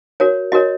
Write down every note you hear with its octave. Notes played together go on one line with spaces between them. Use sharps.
F#4 A#4 C#5
F#4 A#4 C#5 D#5